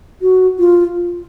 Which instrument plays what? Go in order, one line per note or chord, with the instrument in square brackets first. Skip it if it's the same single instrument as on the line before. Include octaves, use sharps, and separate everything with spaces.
[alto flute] F#4
F4